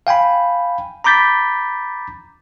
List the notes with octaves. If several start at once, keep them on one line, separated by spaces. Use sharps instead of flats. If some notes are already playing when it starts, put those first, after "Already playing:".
F5 G5 G#5 B5
A#5 B5 D6 G6 A6 B6